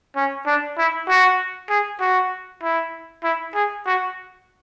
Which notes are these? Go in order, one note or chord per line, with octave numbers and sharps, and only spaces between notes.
C#4
D4
E4
F#4
G#4
F#4
E4
E4
G#4
F#4